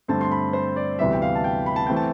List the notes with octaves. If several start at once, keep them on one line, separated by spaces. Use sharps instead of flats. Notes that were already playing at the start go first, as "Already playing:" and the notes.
G2 D3 A3 C4 A5
C6
B5
C5
D5
D2 C3 E3 G3 B3 E5
G5
F5
A5
G5
B5
A5
E3 A3 C4 G5
A5